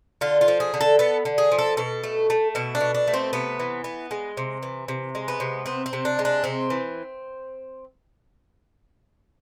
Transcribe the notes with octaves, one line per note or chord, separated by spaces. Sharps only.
D3 F4
F4
F3
G#4
D3
A4
B3 A4
D3
G#4
F3
A4
B2 A4
A3
A3
B2 E4
D4
B2
D4
A3
C4
C3 B3
E3
B3
G#3
C3
E3
C3
G#3
B3
C3
B3 C4
C4
C3
D4
G#3
D4
C3 C4
E3